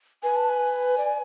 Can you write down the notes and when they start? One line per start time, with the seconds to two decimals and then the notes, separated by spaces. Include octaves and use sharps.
0.23 B4 G#5
0.36 A5
0.49 G#5
0.98 D5